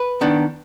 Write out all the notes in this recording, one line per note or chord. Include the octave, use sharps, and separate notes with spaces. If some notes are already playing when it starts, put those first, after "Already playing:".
Already playing: B4
D#3 B3 D4